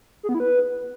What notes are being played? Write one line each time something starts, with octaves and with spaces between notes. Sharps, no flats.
G#4
B3
E4
B4